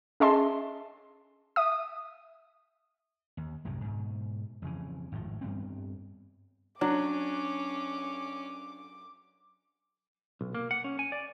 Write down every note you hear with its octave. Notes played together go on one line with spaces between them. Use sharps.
C#4 G#4 D#5 E5 A5 C6
E5 D#6
D#2
C2 F#2 A2 C3
G#2 B2
F2 C#3 E3
G#1 A2 D#3 F3
G2 G3 B3 C4
F#3 C#4 D4 D6
B1
A#3
F#5
C#4
G#5
D5